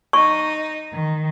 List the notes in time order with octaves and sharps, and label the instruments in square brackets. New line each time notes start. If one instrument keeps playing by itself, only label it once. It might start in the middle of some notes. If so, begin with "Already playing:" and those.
[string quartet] D#4 [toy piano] C#6
[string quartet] D#3